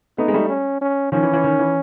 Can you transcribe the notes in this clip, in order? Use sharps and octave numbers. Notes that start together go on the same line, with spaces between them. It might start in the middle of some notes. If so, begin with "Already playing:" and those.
A3 B3 D#4
G#3
G3 A3
C#4
C#4
D#3 F3 C#4
E3
E3
D#3
E3